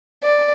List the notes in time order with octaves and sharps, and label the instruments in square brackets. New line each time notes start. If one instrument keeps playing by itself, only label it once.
[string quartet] D5